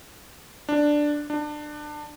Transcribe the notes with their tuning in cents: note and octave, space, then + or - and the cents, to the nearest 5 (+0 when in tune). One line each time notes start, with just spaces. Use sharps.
D4 +5
D4 +25